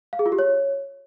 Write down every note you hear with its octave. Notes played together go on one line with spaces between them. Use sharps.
F5
G#4
F4
G4
C#5